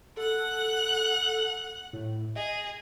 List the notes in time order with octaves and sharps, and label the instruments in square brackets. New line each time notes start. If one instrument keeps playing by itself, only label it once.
[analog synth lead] A4 [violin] F#5 F#6
[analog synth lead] A2
[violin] G#4 [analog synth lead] D#5